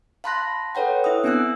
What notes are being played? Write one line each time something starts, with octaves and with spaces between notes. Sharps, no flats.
F5 A5 B5 C6 F#6 A#6
A4 B4 C#5 F#5 G5
E4 E5 D#6
B3 C4 D4 G#5 E6 F#6